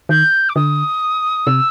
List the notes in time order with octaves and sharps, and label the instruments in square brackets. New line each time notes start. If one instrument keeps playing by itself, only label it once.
[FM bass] D#3 [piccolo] G6
[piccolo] D6
[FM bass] D3 [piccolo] D#6
[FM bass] C3 [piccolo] E6